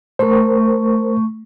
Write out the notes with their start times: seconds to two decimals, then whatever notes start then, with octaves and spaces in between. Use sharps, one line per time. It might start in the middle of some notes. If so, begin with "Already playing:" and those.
0.19 A3 A#4 C5 C#6